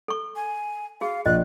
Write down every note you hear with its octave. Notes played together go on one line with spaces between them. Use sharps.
A4 C#6
G#5
F#4 G#4 F5
A#1 D#5 F#6